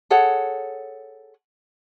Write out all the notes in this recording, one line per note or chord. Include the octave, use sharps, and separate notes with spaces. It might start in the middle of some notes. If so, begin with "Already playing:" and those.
G#4 A4 C#5 F#5